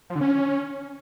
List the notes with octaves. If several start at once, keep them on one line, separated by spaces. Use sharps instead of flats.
F3
D3
C#4